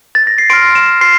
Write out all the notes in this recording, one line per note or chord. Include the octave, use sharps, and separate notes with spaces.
A6
A#6
C7
C6 F6 D7
E7
C6 F6 C7